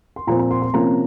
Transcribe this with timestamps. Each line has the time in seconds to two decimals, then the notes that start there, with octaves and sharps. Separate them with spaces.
0.16 C6
0.27 A#2 F3 C4 A#5
0.39 A#5
0.51 C6
0.62 C6
0.73 C3 F3 A#3 C#4 A#5